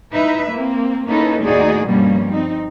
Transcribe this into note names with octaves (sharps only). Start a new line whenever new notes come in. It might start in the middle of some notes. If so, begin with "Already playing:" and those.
D#4 E4 B4 E5
A#3 C4
A#3 C#4 D#4 E4 A4 B4
D#2 A2 D#4 F#4 G#4 D5
G2 B2 F3 G3 A#3 C#4
C4 D#4